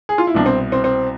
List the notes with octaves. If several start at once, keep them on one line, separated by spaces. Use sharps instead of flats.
G#4
F4
E4
C2 B2 D4
C4
C4
C4